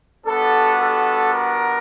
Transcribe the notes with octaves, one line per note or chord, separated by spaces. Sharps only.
G3 B3 D4 F#4 A4
A4
A#4